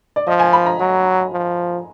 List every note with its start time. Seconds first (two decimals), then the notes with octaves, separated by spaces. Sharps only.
0.16 D5
0.27 F3 D#5
0.40 G#5
0.53 B5
0.66 A#5
0.80 F#3
1.32 F3